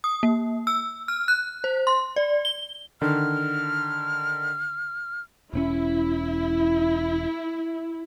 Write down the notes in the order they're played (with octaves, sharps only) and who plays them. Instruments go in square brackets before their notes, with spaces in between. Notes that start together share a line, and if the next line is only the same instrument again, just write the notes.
[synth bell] D#6
A#3
E6
F6
F#6
C5
C6
D5
G7
[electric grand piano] D3 D#3 [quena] F6
[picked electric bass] E1 C4 C#4 [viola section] E4